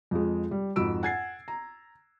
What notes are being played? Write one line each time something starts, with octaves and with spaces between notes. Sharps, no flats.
F2 F3 G#3
G3
F2 G#2 F#4 B5 E6 D7
F#5 G#5 G#6 A6 C7
A#5